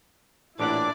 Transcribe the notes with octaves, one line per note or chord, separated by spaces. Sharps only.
A1 A#2 D4 E4 G4 D5 F#5 D6